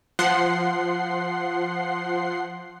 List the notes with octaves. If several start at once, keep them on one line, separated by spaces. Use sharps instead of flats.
F3 F#5 C6 C7